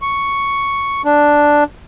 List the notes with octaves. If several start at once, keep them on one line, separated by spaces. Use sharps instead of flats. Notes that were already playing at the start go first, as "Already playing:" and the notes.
C#6
D4